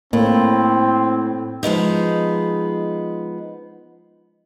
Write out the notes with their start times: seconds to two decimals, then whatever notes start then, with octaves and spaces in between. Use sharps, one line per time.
0.13 A2 A#3 C4
1.63 F3 G#3 B3 D#4